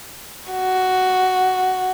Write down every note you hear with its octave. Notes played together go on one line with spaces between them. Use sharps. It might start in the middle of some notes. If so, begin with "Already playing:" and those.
F#4